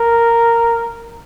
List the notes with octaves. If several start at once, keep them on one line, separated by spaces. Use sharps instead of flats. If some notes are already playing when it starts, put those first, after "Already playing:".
Already playing: A#4